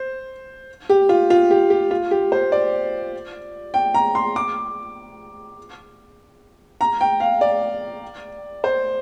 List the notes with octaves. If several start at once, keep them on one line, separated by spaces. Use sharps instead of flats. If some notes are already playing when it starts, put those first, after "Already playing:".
Already playing: C5
G4
F4
F4
G4
G4
F4
G4
C5
D5
G5
A#5
C6
D6
A#5
G5
F5
D5
C5